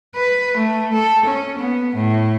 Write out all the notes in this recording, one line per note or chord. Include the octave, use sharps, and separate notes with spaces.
B4
A3
A4
C#4
B3
A2